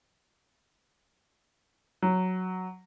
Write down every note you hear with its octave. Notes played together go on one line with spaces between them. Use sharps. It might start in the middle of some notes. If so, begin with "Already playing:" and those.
F#3